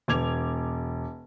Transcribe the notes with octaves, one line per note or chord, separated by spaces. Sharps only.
E1 D6 G#6 F7